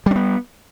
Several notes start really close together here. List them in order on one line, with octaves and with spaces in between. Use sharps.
G3 C#4 B3